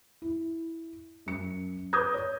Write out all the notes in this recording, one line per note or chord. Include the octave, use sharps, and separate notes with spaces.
E4
F#2 C#7
B4 D6 D#6 G6 G#6 A#6
C#5